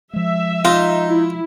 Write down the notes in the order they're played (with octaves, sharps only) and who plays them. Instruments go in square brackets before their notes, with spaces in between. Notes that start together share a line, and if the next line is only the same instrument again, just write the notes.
[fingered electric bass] F3 G#3 [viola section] E5
[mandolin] D#4 [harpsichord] F4
[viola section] E4